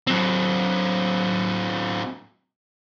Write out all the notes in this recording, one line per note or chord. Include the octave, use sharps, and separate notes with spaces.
F#3 C4